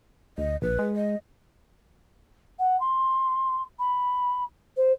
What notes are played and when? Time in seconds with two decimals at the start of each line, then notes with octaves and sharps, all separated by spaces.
0.38 D2 D#5
0.62 A#1 B4
0.79 G#3
0.96 D#5
2.59 F#5
2.80 C6
3.79 B5
4.76 C5